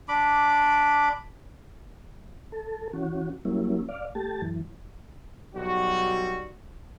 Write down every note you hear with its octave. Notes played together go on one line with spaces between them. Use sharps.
D4 B5 D6
A4
E3 C#4 F#4
F#3 G3 A#3 C#4 E4
D5 F5
A3 G4 A5
F#2 E3
B1 G3 F#4